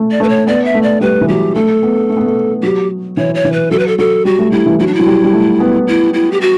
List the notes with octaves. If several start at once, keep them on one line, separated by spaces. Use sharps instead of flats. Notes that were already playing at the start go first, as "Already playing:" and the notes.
Already playing: A3
D5
A3 B4
C#5
B3 D5
E5
A3
D5
G3 B4
E3
F#3 G4
A3 A4
B3
A3
B3
A3
F#3 G4
E3 C#5
C#5
E3
B4
F#3 A4
B4
A4
F#3 A4
G3 F#4
A3
G3 E4
E3
F#3 E4
D4
F#3 E4
G3
G3
A3
B3
E4
E4
G4
F#4